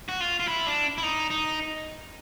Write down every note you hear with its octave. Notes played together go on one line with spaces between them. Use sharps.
F#4
F4
F4
E4
D4
E4
D#4
D#4